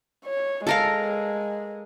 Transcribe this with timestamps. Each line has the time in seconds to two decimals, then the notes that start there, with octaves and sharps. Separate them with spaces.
0.25 C#5
0.67 G#3 A4 A#4 F5